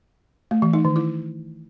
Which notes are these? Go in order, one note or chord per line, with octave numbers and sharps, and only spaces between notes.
A3
E3
D#4
D#3
E4